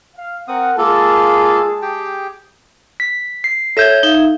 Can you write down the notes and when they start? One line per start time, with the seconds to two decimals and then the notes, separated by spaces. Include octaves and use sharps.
0.16 F5
0.48 C4 A#4 F#5 D#6
0.78 G#3 A#3 F4 G#4 A4 A5
1.82 G4 G#4 G5
3.00 B6
3.44 C7
3.77 A4 C#5 E5 G6 G#6
4.03 D#4 E5 F5